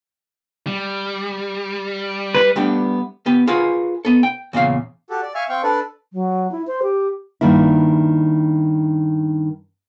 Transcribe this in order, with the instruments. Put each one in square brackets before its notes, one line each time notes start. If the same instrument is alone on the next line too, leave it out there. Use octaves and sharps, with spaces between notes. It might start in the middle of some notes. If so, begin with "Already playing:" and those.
[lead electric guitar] G3
[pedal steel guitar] B4
[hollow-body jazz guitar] G3 A3 B3 D4 G4
B3 G4 B4
F4 F#4 G#4 A#4 B4
B3 A4
G5
E2 A#2 C#3 F5
[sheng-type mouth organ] F#4 G4 A4
D5
E5 F5 G#5 C#6 F6
C4 F5 G5 C#6
D4 A4 B4 D5
[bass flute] F#3
E4
C5
G4
[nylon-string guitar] G2 D#3 A#3 E4